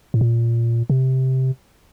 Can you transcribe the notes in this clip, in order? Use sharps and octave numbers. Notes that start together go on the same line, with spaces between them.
A2
A#2
C3